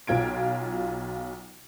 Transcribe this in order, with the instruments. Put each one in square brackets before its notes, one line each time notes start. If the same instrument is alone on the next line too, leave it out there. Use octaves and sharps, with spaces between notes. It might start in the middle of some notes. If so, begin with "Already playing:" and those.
[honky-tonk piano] B1 F#3 F4 G#6 D7